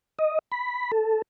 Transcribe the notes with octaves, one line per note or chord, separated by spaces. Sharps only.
D#5
B5
A4